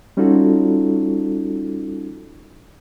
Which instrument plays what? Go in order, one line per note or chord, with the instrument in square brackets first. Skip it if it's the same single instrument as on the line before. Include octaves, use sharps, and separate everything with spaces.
[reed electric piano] G3 C#4 D#4 F4 F#4 A4